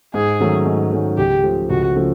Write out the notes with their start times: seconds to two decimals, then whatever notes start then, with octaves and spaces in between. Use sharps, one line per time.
0.14 G#2 G#4
0.40 D#3 F#3 A3 C#4
0.66 G#2
0.92 D#3 F#3 A3 C#4
1.18 C#2 G4
1.44 C#3 F3 A3
1.70 C#2 F#4
1.96 C#3 F3 A3